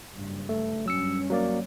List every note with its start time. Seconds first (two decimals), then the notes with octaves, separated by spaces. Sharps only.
0.14 F#1 G2
0.49 A3
0.86 G2 F#3 C#4 E6 C#7
1.30 F#3 A#3 D5